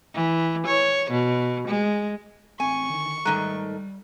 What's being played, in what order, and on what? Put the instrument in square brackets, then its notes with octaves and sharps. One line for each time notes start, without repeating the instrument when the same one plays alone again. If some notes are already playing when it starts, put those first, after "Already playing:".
[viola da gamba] E3
C#5
B2
G#3
[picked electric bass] A1 C4 [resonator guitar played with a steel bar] G#5 [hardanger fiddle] C#6
[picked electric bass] D3 D#3
[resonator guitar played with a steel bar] G#2 D#3 A3 [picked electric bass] G3 [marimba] A#5 F#6